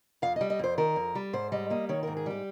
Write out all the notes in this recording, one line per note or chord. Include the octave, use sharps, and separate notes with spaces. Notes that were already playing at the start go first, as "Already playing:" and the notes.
F2 F5
D#5
G3
D#5
F2 C5
D#3 A#4
F2
G3
G#2 C5
G3 D#5
A#3 D#5
D#3 C#5
G#2 A#4
G#4
G3 G4